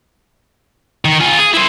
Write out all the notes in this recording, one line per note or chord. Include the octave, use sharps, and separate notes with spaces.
D#3
F4 G#4
G#4
E4 C5